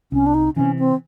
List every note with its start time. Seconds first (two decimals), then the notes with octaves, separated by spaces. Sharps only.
0.12 C2 C#4
0.26 D4
0.34 D#4
0.56 C3 E3 C#4
0.79 C4